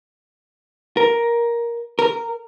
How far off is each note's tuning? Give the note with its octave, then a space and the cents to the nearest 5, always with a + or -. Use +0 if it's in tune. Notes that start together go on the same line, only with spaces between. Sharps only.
A#4 +10
A#4 -10